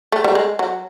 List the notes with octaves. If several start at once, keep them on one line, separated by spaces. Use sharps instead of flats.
A3
G3
G#3
F#3